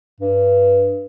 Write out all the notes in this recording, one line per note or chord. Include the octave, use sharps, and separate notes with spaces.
G2